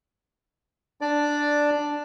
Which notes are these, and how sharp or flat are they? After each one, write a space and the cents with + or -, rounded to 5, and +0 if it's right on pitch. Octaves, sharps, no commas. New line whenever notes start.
D4 +0 D5 +0